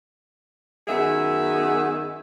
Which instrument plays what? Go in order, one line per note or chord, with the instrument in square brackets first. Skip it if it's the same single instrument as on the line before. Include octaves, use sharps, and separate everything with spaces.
[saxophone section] F#2 D#3 B3 G#4 E5